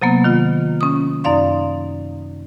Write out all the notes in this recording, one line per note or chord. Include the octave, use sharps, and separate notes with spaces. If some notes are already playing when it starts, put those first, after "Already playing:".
C3 F#3 A#3 B3
D#3 F4
C#4 D#6
F#2 D#4 D5 F5 C6